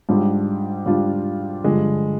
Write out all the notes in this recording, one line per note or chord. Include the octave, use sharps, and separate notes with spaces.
G#2 G3 D4 F4
G#2 G3 D4 F4
G2 D3 F3 G#3